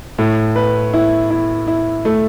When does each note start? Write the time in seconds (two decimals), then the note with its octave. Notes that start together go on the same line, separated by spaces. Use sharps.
0.18 A2
0.56 B4
0.94 E4
1.30 E4
1.68 E4
2.05 A3